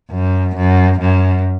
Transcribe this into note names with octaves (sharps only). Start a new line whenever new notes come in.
F#2
F#2
F#2